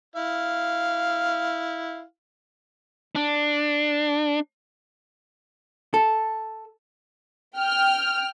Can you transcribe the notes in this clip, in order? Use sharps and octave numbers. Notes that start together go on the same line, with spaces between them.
E4 F5
D4
A4
G5 F6